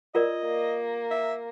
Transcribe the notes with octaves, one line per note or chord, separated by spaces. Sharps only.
F4 A#4 D5 D#5
A#3
E5